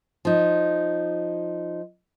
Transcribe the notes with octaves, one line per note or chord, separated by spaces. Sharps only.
F3 D#4